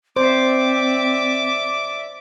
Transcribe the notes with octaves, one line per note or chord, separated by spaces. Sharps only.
C4 C5 D5 E5 D6